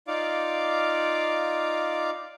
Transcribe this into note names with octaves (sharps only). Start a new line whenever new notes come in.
D#4 F4 D5 F5 D6